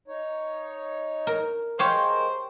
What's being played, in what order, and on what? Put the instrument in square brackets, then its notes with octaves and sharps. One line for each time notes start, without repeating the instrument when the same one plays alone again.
[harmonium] D#4 C#5
[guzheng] A#4
[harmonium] G#3 A#4 [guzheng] G4 C#5 F5 [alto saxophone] C5